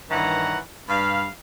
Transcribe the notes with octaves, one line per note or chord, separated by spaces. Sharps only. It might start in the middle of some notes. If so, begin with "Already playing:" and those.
G2 D#3 E3 C#5 F#5 A#5
G2 F5 B5